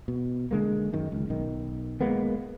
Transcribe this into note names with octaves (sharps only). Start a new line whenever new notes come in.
B2
D3 G#3 A#3
F#2 D#3
C#2
B1 D#3
G#3 A#3 B3